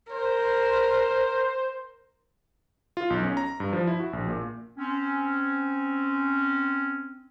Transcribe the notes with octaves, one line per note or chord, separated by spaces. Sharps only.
A#4 C5
F4
B1
C#4
A#5
G2
F3
E4
F#4
A#1
A#2
C4 C#4